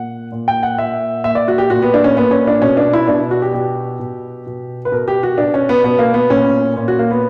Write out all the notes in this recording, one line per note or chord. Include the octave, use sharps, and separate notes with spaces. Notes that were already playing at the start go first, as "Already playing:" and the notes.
Already playing: A#2 F#5
A#2
G5
F#5
A#2 E5
A#2 E5
D5
F#4
G4
A#2 F#4
B3
D4
C#4
A#2 B3
C#4
D4
B2 C#4
D4
E4
B2 D4
F#4
G4
B2 G4
B2
B2
B4
B2 A#4
G4
F#4
B2 D4
C#4
B3
B2 B3
A#3
B3
A#2 C#4
A#2
F#4
A#3
B3